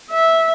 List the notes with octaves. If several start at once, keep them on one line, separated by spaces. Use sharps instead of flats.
E5